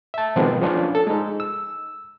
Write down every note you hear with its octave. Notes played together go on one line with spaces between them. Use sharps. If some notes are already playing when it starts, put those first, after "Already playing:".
E5 A5
B2 D#3 F3 G#3 B3 C4
F3 C#4 D4 F4
A4
G#3 D#4
E6